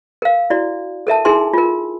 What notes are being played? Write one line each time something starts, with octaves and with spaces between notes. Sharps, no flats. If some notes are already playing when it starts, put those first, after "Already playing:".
A#4 F5
E4 F#4 D5
A4 A#4 E5 A5
D#4 E4 G#4 A#4 G#5 C6
F4 A#4